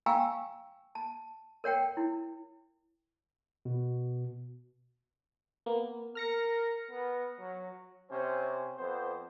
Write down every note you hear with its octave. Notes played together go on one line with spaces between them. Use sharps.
F5 G5 G#5 A#5 C#6 E6
A5
A#4 C#5 F#5 G5
E4
B2
A#3 B3
A#4 F6 A#6 C#7
B3
F#3
C3 C#4 C5
F2 B3 C5